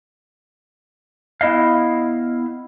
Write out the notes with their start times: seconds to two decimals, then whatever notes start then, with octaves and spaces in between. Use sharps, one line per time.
1.41 B3 E4 D#5 F5